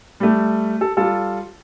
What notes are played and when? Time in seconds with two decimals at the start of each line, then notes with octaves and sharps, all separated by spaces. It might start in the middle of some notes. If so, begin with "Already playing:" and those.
0.20 G3 A3
0.81 A4
0.97 G3 F4 A4